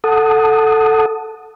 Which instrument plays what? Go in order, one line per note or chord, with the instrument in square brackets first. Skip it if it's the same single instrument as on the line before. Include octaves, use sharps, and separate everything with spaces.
[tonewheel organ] A4 F#5 A5 D#6